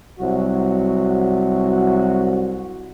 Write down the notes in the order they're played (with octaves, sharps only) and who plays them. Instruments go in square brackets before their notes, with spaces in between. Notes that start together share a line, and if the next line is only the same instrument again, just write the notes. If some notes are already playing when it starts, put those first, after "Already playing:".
[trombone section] C2 F#3 F#4